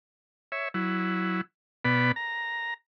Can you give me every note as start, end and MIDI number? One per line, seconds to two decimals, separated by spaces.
0.52 0.68 73
0.52 0.68 76
0.74 1.41 54
0.74 1.41 64
1.85 2.12 47
1.85 2.12 59
1.85 2.12 74
1.85 2.12 83
2.16 2.74 82